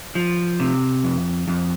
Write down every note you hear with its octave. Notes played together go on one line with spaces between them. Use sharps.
F3
C3
F2
F2